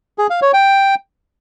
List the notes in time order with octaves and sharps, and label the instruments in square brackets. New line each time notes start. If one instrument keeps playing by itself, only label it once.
[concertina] G#4
F5
C#5
G5